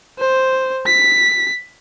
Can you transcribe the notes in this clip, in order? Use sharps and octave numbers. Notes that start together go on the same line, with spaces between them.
C5
B6